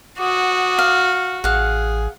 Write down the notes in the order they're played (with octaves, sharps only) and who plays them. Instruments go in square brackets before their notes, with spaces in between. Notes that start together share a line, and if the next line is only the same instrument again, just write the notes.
[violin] F#4 [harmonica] F#5 D6 D#6
[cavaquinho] F5
[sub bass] A1 [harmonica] G#4 [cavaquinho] F5 F#5